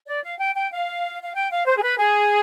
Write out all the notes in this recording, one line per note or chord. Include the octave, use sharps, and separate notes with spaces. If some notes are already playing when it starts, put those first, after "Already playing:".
D5
F5
G5
G5
F5
F5
G5
F5
C5
G#4
B4
G#4